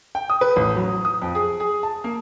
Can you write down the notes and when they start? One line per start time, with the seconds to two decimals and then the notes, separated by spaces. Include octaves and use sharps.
0.15 G5
0.30 D#6
0.41 B4
0.56 A1
0.75 F#3
1.05 D#6
1.22 F2
1.35 G#4
1.60 G#4
1.83 A5
2.04 A#3